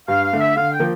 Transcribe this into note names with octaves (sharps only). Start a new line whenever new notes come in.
G2 F5
F5
D3 A3
E5
D3 F5
G5
F3 A#3